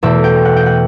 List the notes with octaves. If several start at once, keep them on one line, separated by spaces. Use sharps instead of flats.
E2 B2 A3 E5
G5
F#5
G5
F#5